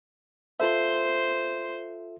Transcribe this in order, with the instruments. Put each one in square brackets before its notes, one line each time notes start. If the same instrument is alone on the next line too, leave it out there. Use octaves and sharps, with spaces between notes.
[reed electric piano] F4 A4 E5 [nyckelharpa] C5 C6